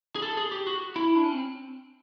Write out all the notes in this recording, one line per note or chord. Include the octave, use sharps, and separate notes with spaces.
G#4
A4
G#4
G4
F#4
E4
D4
C#4
C4